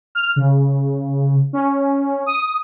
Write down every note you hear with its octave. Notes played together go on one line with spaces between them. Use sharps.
F6
C#3
C#4
D#6